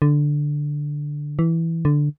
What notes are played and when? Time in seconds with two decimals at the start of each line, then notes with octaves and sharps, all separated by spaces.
0.02 D3
1.39 E3
1.85 D3